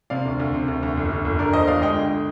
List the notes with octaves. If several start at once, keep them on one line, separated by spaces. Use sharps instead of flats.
C3 D5 F5
D2
D2
C3
D2
D2
G1
D3
G1
D3 A#4 D5
G1 C5 D#5
G1 D5 F5
G#3 D#5 G5
D3